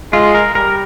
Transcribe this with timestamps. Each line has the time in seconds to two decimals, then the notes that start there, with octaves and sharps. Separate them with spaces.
0.12 G#3 F4
0.34 A#4
0.55 G3 A#4